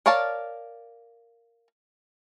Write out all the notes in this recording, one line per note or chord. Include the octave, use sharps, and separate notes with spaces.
A#4 C#5 D5 F5 A5